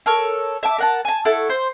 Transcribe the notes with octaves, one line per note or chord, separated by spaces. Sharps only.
A4 A#4 C#5
E5 A5 D6
A#4 F#5 A5
G#5 A5
E4 A4 F#5 C#6
C5